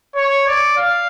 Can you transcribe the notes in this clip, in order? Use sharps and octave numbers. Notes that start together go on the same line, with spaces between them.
C#5
D5
F5